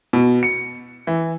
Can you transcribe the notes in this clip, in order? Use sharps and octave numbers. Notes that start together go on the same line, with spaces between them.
B2
C#7
E3